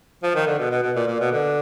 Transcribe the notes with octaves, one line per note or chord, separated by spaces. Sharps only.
F3
D#3
D3
B2
B2
B2
A#2
A#2
B2
D3